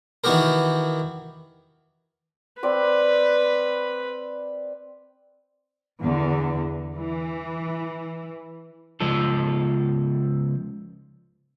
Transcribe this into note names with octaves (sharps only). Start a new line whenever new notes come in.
D#3 E3 B3 F#4 G4 A#4
C4 B4 D5 G5
E2 D3
E3
C#2 F3 A4